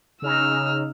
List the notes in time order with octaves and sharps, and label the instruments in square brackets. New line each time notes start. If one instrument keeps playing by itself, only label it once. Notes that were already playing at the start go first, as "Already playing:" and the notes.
[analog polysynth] C#3 D#4 [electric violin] E6 F6